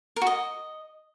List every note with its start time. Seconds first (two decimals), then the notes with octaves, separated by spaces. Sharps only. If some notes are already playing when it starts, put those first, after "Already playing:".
0.16 A#4
0.22 F#4
0.27 D#5